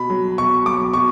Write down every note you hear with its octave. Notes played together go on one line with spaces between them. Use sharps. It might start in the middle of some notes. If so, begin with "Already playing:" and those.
Already playing: B2 B5
F#3
B2 C#6
F#3 D6
B2 C#6